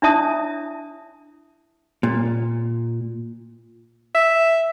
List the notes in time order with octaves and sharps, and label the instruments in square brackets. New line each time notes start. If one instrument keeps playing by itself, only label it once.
[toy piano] D4 E4 C#5 E5 A5 D#6
[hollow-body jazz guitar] A#2
[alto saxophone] E5